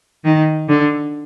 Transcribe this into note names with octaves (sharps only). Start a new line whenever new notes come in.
D#3
D3